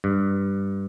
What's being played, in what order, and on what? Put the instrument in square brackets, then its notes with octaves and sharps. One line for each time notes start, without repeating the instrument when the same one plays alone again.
[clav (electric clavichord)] G2